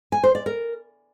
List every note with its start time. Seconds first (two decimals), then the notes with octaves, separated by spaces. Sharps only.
0.12 G#5
0.23 C5
0.35 D5
0.46 A#4